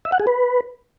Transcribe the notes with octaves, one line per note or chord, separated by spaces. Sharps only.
E5
F#5
G#4
B4